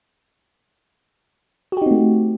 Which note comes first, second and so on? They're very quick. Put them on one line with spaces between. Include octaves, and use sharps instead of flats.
F#4 G4 D#4 C4 A3